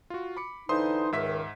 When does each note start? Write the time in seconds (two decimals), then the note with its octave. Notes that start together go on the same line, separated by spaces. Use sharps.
0.10 F4 F#4
0.37 B5 D6 C#7
0.69 D3 E3 D#4 C5 C6 D#6
1.12 C#2 G#2 D#3 E5 B6